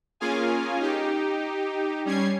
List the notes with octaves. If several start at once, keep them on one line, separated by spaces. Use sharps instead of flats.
A#3 C#4 F4 G#4 F5 G#5
D#4 G4
G3 C#4 G#6 C7